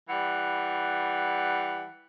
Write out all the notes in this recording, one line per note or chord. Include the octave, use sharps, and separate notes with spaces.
E3 G3 F#5